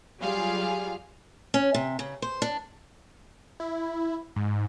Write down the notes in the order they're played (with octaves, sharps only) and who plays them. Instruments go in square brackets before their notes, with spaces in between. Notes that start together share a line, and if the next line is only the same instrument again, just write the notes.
[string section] F#3 G3 F4 G#4 F5
[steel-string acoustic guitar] C#4
C3
C#3
C5
D4
[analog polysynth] E4
G#2